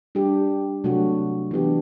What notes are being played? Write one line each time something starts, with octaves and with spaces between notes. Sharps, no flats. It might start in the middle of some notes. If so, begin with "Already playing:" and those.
G3 D4 G4
C3 F#3 A3 D4 F#4
E3 B3 D4 G4